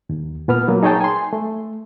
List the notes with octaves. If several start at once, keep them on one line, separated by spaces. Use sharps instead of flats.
D#2
A#2 B3 B4 F6
F#3 A#3
D#4 G#4 C#5 D#5 G5 A5
G#5 C6
A3